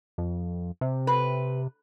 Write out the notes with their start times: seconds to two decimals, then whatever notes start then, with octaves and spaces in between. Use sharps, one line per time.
0.18 F2
0.81 C3
1.07 B4